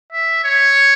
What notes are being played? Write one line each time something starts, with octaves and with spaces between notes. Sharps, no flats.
E5
C#5